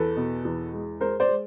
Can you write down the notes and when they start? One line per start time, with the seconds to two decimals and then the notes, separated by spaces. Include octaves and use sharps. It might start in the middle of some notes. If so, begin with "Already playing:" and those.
Already playing: E2 A4 B4
0.16 B2
0.45 E2
0.72 G#3
1.01 G#3 A#4 C5
1.20 C5 D5
1.28 G#3